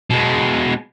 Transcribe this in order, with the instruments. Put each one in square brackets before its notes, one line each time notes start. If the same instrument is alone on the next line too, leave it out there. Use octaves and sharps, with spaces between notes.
[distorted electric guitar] B2 G#3